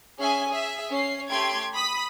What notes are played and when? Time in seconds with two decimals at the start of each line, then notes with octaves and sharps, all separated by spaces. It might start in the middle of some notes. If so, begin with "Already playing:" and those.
0.19 C#4 G#4 E5 G#5
0.49 G#4 E5
0.89 C#4 C7
1.29 A3 G4 G5 C6 G#6 D7
1.74 B5 D#6 B6